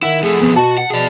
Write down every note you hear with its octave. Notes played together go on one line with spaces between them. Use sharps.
D#3 E4 F#5
F2 A3 G#4
F2 B2 B3
B2 F#4 A5
F#5
B2 G#4 D5